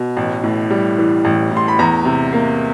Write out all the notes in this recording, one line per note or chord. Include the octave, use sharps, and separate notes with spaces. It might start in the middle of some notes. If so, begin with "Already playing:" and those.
Already playing: B2
A1
A2
G3
E3
A1
A2
C6
B5
E2 A#5
C3
A#3